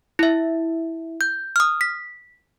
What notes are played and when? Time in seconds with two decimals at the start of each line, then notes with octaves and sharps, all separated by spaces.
0.19 E4 E5
1.21 G6
1.56 D#6 F6
1.81 B6